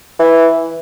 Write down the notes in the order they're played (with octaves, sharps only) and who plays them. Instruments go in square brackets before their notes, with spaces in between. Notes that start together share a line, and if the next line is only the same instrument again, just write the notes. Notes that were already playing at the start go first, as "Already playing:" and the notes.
[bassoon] E3